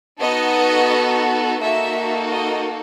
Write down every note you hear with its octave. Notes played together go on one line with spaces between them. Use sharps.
B3 D#4 F#4 A4 D#5
A#3 D#4 F#4 A4 E5
D#5